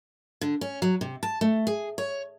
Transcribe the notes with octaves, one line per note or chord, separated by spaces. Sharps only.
D3
C#4
F#3
C3
A5
A3
G#4
C#5